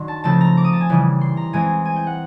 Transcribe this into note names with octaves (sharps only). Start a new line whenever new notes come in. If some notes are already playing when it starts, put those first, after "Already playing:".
Already playing: D#3 F#3 D4 C6
A5
C#3 F3 A3 C4 A5
A#5
D6
D#6
A5
G#5
C#3 E3 G3
C6
A#5
E3 G#3 C4 G#5
G#5
G5
F#5